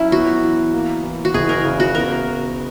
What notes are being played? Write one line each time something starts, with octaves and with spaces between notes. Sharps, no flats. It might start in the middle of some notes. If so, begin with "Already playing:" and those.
Already playing: F#3 C#4 E4
B3 F#4
E3
A#3
E3
F#4
F#1 G#4
A#4
C#3
F#4
B3 A#4